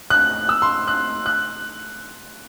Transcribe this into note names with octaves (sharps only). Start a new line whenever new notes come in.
F#6
E6
C6
F#6
F#6